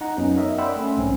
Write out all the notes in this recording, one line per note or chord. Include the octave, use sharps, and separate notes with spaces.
D#4 F#5 A#5
F#2 F#3 B3 C#4 D#4
A#4 C#5 D#5 E5
D5 F#5 G5 B5 C6 E6
A3 C#4
B1 G#2 C4 C#4